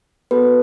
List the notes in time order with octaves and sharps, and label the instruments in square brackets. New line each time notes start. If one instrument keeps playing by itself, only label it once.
[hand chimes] B3 F#4 A4 B4